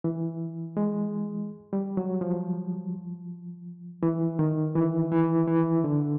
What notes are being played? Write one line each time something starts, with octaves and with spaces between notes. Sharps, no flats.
E3
G#3
G3
F#3
F3
E3
D#3
E3
E3
E3
D3